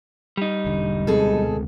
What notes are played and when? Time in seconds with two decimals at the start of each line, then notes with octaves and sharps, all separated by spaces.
0.37 G3 D#4
0.66 E1 D3 D4
1.07 D2 B2 G#3 C4 G#4 A4